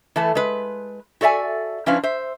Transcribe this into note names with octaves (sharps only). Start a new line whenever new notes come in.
E3 A3 B4 A5
G#3 B4
F#4 A4 D5 E5 G#5
F3 C#4 D4 E4 B4 F5
C5 E5